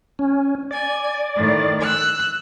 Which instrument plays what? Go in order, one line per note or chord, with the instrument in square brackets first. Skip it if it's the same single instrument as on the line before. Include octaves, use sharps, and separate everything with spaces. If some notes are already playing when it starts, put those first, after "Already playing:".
[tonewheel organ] C#4
[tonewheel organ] D5 [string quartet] G#5
[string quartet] A2 D#3
E6 F#6